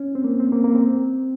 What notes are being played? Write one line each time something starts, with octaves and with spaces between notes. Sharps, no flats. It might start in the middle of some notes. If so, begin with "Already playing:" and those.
Already playing: C#4
C4
A#3
C4
A#3
A#3
C4